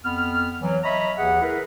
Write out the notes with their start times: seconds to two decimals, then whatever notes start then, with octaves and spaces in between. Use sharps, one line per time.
0.05 F2 B3 B5 F6
0.62 E3 F#3
0.84 C#5 D#5 E5 A#5 B5
1.17 D#2 E3 G#4 F#5
1.42 E4 G#4 A#4 B4